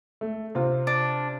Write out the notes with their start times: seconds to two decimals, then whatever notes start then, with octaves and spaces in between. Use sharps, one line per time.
0.21 A3
0.55 C3 C4 F4
0.87 D4